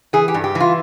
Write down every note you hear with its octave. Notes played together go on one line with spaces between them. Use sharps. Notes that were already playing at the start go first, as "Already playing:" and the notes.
E3 G#4
G4
G2
G4
E3
F4